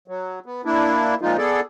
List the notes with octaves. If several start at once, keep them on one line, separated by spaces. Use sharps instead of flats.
F#3
B3
A#3 D4 E4
A#2 F3 G#3 D#4 F4
B3 G#4 A4 D5